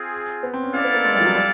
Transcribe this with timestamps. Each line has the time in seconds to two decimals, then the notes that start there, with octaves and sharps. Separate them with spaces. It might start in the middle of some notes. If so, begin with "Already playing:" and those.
Already playing: C4 F4 G#4
0.43 B3
0.54 C4
0.63 C#4
0.74 C#4 E4 A4 D5 F5
0.84 B3
0.94 A#3
1.05 G#3
1.15 G3
1.20 F3
1.25 F#3
1.35 G3